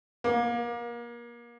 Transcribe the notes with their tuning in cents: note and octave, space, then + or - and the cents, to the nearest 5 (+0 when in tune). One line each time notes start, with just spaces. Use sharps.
A#3 +30